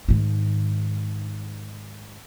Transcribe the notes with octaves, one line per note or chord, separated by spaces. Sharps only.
G#2 D#3